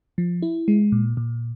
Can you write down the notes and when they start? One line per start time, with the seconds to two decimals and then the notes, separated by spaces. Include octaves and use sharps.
0.18 F3
0.42 E4
0.68 G#3
0.92 A#2
1.17 A#2